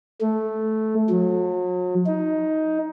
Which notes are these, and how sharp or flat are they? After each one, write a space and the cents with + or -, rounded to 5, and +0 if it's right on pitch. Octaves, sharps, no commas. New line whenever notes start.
A3 -10
F#3 -40
D#4 +15